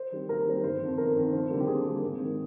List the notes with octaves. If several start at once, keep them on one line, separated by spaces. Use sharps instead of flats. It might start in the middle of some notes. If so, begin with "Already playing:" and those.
Already playing: C5
D#3 G3 C4
D#2 A#4
D#3 G3 C4
G1 C5
F2 D#3
G1 A#4
F2 D#3
F2 C5
D3 G3 A#3
G4
F2 G#4
D3 G3 A#3
G#1
G#2 D#3